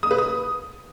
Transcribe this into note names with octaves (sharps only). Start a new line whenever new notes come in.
D#6
B4
D#6